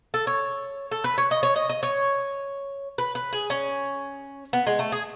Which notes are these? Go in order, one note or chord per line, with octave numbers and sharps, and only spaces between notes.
A4
C#5
A4
B4
C#5
D#5
C#5
D#5
D#5
C#5
B4
B4
G#4
C#4
B3
G#3
A3
G#4